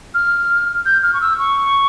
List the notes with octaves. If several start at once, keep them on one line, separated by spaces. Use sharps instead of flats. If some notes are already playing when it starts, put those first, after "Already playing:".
F6
G6
F6
C#6
E6
C#6